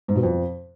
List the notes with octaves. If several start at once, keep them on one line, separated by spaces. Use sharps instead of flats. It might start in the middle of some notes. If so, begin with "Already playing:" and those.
G#2
B2
F2